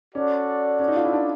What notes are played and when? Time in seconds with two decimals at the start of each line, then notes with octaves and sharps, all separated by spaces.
0.15 C#4 F#4 A4 D5
0.80 C#4
0.88 D#4
0.96 F4
1.05 E4
1.13 D4